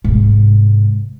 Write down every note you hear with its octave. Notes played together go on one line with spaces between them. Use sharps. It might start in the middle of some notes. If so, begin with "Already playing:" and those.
G#2 C3